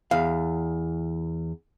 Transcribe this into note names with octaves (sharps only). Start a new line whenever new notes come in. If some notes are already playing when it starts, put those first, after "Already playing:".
E2 F5